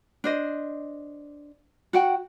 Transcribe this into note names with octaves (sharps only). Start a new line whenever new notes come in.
D4 C5 D#5
F#4 F#5 G5